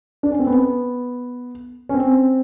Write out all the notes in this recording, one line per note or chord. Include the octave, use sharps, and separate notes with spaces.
D4
C#4
C4
B3
C#4
C4